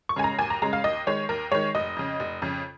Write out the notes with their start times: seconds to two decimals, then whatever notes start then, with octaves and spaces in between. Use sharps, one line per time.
0.09 C#6
0.16 C#3 G#3 G#5
0.24 A#5
0.39 D#2 G#5
0.50 A#5
0.62 C#3 G#3 A#5
0.73 F5
0.84 D#2 D#5
1.07 D#3 G#3 C#5
1.29 D#2 A#4
1.52 D#3 G#3 C#5
1.75 F1 D#5
1.96 F2 C#3
2.19 F1
2.42 F2 C#3